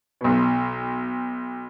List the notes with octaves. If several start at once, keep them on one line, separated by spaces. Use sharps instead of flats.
B1 B2